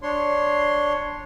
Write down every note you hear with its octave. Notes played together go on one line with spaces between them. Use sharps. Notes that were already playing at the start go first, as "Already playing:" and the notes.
D4 C#5 C6